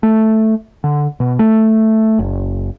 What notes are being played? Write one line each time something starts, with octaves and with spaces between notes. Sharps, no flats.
A3
D3
B2
A3
F#1